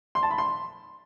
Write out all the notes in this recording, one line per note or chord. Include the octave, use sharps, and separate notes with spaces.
C6
A5
B5
C6